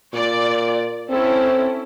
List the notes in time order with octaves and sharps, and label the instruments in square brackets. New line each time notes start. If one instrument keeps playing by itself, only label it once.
[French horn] A#2 [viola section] D5
[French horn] C4 [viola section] C#4 E4 A4